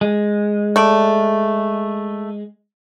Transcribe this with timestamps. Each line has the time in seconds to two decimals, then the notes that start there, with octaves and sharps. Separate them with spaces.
0.01 G#3
0.76 A3 D5